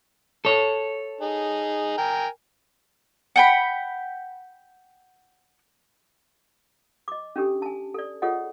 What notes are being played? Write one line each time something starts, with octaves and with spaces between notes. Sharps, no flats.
A4 C#5
D#4 G#4
A#4 G5 G#5
F#5 G5 B5
D#5 D6
C#4 D4 G4 A4
G#5 A5
A4 D5
F4 G#4 A4 C#5 D#5 F#5